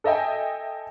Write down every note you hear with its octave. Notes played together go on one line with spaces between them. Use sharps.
A4 D#5 E5 G5 G#5